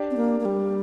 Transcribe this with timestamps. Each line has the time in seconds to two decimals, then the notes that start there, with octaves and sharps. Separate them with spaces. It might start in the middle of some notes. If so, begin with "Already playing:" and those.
Already playing: D4 G4
0.11 C4
0.17 A#3
0.40 A#3
0.45 G3